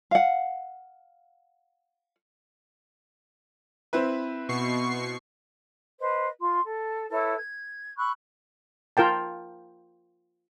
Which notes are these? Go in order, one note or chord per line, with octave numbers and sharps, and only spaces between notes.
F5 F#5
C4 E4 B4
B2 C#6 C7
B4 C5 D#5
F4 C6
A4
E4 A4 B4 C#5
G#6
B5 C#6 E6 F#6
F4 A#4 G5 A5